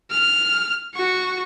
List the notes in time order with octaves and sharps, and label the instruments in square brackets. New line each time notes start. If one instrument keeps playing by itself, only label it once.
[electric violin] F6
F#4 C#6